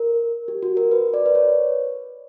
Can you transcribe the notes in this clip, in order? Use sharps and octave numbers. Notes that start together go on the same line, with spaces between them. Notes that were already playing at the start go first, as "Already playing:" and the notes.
Already playing: A#4
G4
F#4
A#4
B4
D5
B4
C#5